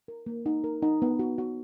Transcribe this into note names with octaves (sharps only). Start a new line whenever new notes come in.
A#4
A#3
D#4
A#4
D#4
B3
F#4
F#4